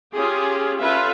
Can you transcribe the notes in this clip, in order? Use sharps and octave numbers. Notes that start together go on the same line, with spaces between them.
C#4 F4 G4 G#4
C#4 F4 A4 B4 E5 F5